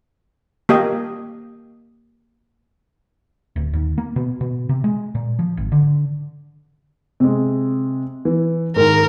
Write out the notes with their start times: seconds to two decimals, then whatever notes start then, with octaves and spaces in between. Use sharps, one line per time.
0.69 A#3 G4 D#5
3.56 D1
3.74 D#2
3.98 A#3
4.16 B2
4.41 B2
4.69 C3
4.84 G#3
5.15 A#2
5.39 F3
5.57 G#1
5.72 D3
7.20 C3 G#3
8.25 E3
8.76 G#2 D#3 A#4